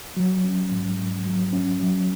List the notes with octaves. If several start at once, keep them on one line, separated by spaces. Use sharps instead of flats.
F#3
C#4
G#2
G#2
F#3
C#4
F#3